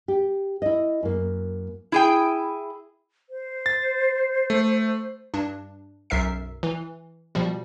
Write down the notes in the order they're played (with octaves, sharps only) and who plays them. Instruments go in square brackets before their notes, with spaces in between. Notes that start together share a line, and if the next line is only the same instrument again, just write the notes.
[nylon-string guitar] G4
E4 D#5
F#2 A#3
[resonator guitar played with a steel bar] E4 G#4 G5
[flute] C5
[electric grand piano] A6
A3
[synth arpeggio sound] G2 D4
B1 F#2 A#4 E5 C7
E3
B2 F3 G3